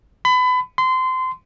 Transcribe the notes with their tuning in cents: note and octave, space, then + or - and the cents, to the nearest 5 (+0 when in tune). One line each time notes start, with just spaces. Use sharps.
B5 +30
C6 -25